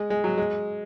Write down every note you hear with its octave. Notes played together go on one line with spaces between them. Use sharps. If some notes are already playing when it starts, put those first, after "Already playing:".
Already playing: G#3
G#3
F#3
G#3